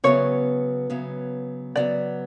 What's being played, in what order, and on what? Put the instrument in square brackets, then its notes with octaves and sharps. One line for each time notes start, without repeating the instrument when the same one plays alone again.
[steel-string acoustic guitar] C#3 F#3 B3 [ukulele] C#5
[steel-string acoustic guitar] C#3 F#3 B3
[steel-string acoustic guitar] C#3 F#3 B3 [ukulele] D5